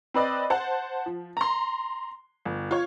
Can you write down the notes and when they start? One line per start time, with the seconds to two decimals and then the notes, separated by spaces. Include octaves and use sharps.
0.14 C4 B4 D5 D#5
0.50 C5 F#5 A5
1.06 F3
1.37 A#5 C6
2.45 G1
2.71 F4 C#5